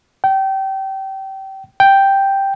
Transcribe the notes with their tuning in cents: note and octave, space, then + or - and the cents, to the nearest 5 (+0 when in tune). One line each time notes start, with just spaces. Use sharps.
G5 -25
G5 +0